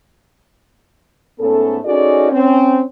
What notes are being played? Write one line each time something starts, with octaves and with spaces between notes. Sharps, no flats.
G#2 A3 B3 C#4 A4
C#4 D#4 F#4 G#4 A4 D5
C4 C#4